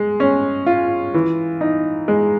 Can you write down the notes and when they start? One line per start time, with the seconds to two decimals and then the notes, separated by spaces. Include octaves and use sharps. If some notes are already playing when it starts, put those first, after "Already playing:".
Already playing: G#3
0.20 C#4
0.66 F4
1.14 E3
1.61 D#4
2.08 G#3